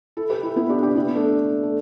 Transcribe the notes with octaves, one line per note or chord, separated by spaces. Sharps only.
E4 A4
G4 B4
E4 A4
B3 E4
D4 G4
D4 G4
B3 E4
A3 D4
A3